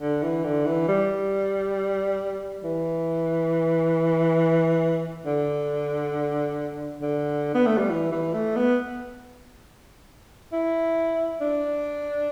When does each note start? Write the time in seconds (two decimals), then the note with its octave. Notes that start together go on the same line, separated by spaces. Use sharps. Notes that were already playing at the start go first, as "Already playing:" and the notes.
0.01 D3
0.23 E3
0.44 D3
0.66 E3
0.88 G3
2.64 E3
5.26 D3
7.02 D3
7.55 B3
7.66 A3
7.78 G3
7.90 E3
8.12 E3
8.33 A3
8.56 B3
10.53 E4
11.41 D4